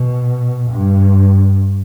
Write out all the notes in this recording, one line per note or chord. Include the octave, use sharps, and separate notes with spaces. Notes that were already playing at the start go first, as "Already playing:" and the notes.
Already playing: B2
G2